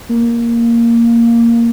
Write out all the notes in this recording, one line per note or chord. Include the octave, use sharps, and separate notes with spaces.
A#3